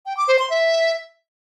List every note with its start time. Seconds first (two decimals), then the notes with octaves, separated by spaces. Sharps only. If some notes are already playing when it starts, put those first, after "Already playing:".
0.06 G5
0.17 D6
0.28 C5
0.39 C6
0.50 E5